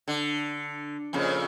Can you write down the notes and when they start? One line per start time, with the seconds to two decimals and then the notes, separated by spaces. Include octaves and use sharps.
0.08 D3
1.13 F2 A#2 C#3